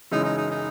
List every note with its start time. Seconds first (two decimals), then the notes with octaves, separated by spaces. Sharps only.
0.12 F#1 F#2 E3 G#3 D#4
0.25 D#4
0.38 D#4
0.51 D#4